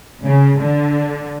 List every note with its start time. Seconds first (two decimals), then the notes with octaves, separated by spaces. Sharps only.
0.25 C#3
0.61 D3